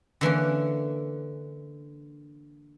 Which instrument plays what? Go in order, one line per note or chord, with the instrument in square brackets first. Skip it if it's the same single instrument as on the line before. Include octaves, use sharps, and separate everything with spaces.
[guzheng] D3 E3 A#3 C#4